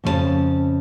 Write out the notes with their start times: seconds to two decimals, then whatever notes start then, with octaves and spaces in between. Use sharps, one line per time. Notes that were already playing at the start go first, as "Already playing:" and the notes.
0.04 F2 C#3 C#4 E4 A5